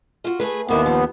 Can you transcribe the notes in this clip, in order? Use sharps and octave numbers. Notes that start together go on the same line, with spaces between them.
F4 F#4
A3 G#4 B4
D#2 C3 A#3 B3 E4
F3